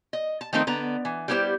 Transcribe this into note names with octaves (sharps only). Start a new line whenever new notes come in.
D#5
A5
D#3 F3 A3 C4 D#4 A#4
D3 B3 A#5
E3
G3 B3 E4 G4 G#4 C5